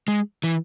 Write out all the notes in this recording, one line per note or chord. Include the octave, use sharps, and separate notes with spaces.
G#3
E3